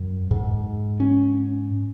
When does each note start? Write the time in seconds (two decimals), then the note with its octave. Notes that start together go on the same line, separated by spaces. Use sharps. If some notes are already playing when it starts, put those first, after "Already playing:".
Already playing: F#2
0.31 G#2
1.00 C#4